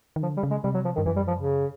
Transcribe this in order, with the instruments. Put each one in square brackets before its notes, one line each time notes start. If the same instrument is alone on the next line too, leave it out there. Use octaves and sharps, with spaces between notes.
[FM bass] D#3
[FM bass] D3 [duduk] F3
[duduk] G3
[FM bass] C#3
[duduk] G#3
[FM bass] C3 [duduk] G3
[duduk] F#3
F3
D#3
[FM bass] G2
[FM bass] F#2 [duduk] E3
[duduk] G3
F3
C#3